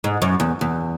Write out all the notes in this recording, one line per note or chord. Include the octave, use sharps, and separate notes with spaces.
G#2
F#2
E2
E2